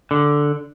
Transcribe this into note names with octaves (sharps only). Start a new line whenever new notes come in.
D3